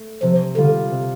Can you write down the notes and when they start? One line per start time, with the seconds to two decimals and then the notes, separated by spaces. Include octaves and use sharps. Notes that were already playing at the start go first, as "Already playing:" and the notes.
Already playing: A3
0.23 C3 F3
0.57 D3 G3 F4
0.92 C3